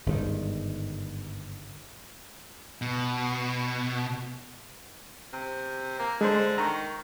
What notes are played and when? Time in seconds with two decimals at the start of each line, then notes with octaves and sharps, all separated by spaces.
0.06 G1 G#2 C3 D#3
2.82 B2
5.33 C3
5.99 A#3
6.21 D3 G#3 C5
6.58 D#3 A#5 C#6